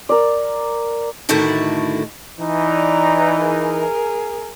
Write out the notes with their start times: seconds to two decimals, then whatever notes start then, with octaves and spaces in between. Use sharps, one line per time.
0.09 A#4 D5
1.29 A2 D3 D#3 E4 F#4 A4
2.39 E3 D#4
2.69 D5 A#5
3.40 G#4 A#4